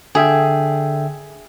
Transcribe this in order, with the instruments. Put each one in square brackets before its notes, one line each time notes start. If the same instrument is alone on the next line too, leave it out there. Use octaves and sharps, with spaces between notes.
[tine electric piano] D3 E5 G5 [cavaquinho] G#4